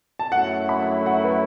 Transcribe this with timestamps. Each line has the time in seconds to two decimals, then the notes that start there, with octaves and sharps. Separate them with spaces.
0.19 A5
0.31 F#2 F#3 A3 E4 F#5
0.69 B5
1.06 F#5
1.24 B4